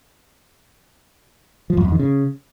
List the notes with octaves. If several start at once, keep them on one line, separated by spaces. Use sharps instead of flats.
F3
F#2
F2
D#3
C#3